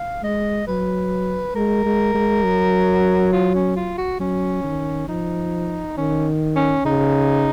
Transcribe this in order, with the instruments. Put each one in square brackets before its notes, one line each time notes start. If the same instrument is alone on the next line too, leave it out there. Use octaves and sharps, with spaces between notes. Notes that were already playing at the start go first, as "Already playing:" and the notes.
Already playing: [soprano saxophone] F5
[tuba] G#3 [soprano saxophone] D#5
[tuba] F#3 [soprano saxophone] B4
[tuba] G#3 [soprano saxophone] A#4
[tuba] G#3
G#3
F#3
[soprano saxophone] F4
C#4
F4
F#4
[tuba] F#3 [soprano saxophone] C#4
[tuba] D#3
[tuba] F3 [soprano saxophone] D#4
[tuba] D#3 [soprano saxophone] C#4
[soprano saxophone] C#4
[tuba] C#3 [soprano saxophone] D#4